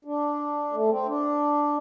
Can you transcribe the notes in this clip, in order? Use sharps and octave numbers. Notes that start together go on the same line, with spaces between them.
D4
A3
C4
D4